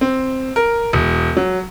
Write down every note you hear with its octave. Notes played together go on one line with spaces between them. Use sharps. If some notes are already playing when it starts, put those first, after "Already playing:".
C4
A#4
E1
F#3